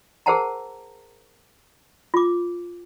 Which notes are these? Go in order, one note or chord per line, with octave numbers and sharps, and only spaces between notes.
G#4 A#4 C5 F#5 A5 A#5
F4 D6